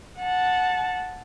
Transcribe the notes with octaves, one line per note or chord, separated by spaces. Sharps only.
F#5 A5